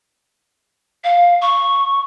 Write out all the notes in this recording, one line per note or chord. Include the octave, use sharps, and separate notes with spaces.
F5
C#6